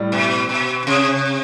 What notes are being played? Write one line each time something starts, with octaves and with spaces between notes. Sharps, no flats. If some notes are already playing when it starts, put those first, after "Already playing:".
Already playing: A2 G3
B2
B2
C3